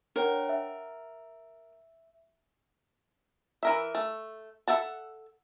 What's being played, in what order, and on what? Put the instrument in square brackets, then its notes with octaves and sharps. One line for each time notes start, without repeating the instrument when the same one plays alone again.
[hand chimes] D4 C#5 G5 [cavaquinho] A#4 F#5
[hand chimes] E5
[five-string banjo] E3 A#4 E5
A3
A4 A#4 E5 F#5 A5